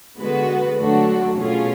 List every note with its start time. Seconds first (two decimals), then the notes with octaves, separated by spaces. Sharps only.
0.18 D3 G#3 B3 F#4 B4
0.77 D3 F#3 A3 D4 F#4
1.36 B2 A3 C#4 F4 G#4